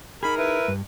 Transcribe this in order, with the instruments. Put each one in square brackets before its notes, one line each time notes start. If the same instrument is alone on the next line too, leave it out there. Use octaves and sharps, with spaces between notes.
[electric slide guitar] D#4 G#4 [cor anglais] A#4 [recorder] B5
[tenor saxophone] E4 [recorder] B4
[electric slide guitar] G2